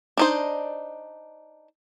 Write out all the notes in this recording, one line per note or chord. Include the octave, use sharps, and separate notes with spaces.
D4 D#4 C5